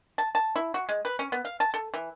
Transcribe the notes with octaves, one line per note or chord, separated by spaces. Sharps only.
A5
A5
E4
F#4
G#3
B4
C#4
B3
F5
A5
A4
E3